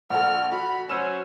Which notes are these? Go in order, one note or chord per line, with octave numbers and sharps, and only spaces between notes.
A#1 A4 F#5 F6
F#4 B5
F#3 C#4 C5 E6 E7